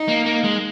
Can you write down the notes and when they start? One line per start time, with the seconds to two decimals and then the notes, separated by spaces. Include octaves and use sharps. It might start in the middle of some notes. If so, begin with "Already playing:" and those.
Already playing: D#4
0.08 A#3
0.26 A#3
0.44 G#3